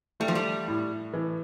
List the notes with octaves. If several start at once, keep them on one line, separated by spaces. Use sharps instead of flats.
G3 A3
F3
G3
A2
E3